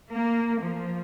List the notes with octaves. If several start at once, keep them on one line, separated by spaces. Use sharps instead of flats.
A#3
F3